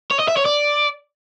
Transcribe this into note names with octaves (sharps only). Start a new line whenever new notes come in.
C#5
D#5
E5
C#5
D5